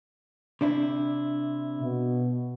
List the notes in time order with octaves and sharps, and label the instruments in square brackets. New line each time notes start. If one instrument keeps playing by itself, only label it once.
[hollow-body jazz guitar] C3 D4 E4
[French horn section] B2